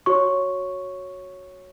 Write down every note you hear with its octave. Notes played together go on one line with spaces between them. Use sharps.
F#4 C#5 C#6